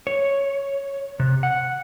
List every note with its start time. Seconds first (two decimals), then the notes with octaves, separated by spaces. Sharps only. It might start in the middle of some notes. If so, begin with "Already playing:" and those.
0.07 C#5
1.20 C3
1.43 F#5